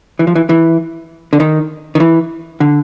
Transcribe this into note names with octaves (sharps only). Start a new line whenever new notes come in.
E3
F3
E3
E3
D3
D#3
D#3
E3
D3